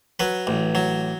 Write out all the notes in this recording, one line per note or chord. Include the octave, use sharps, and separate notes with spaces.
F#3 B4
A1
F#3